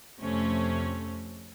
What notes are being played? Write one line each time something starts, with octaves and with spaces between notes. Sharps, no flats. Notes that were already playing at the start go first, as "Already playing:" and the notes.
F2 C3 A3 C#4